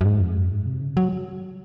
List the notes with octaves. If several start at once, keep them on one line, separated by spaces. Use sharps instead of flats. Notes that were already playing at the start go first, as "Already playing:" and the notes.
F#2
G#2
F2
F#2
G#2
C3
C#3
F#3